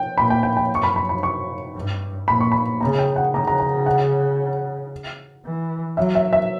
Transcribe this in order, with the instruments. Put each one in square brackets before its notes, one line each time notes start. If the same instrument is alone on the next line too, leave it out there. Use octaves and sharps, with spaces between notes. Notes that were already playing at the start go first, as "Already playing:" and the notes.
Already playing: [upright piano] G5
[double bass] A#2 [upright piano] B5
[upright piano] G5
G5
G5
[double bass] F#2 [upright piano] C#6
[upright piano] B5
B5
B5
C#6
[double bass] G2
[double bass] A#2 [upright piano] B5
[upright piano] C#6
B5
[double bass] C#3 [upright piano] A#5
[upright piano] G5
F#5
[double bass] C#3 [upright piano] A#5
[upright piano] A#5
A#5
F#5
[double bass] E3
[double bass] F#3 [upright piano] E5
[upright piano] E5
E5